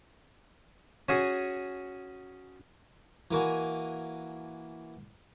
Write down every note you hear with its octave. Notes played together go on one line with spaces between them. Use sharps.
C#4 F#4 G#4
E3 A#3 F#4 G#5